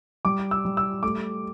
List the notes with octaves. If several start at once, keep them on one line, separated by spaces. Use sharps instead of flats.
G3 D6
E6
G3
E6
A3 D6